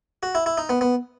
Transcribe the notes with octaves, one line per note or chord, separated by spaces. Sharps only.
F#4
E4
E4
D#4
B3
B3